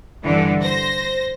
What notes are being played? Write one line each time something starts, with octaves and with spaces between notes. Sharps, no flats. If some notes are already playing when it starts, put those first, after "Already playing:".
G2 D3 E3
C5 A#6